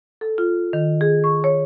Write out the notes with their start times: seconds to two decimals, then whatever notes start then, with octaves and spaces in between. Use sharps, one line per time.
0.21 A4
0.38 F4
0.73 D#3
1.01 G#4
1.24 C#6
1.44 C#5